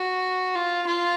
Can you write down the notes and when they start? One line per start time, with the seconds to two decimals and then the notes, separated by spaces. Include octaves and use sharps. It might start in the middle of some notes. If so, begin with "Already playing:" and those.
Already playing: F#4
0.55 F4
0.87 F4